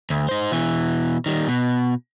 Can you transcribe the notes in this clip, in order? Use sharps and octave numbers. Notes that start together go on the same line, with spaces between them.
D2
D#4 C5
B2 E3
D#3 G3
B2